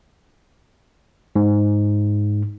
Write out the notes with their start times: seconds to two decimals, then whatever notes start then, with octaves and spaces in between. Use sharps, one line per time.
1.36 G#2